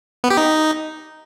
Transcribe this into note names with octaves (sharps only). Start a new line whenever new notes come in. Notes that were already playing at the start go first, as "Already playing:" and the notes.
B3
G4
D#4